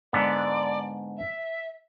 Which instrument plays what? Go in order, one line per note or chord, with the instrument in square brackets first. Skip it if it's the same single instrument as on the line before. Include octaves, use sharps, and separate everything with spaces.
[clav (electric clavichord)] G#2 D3 B3 [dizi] D5
[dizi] E5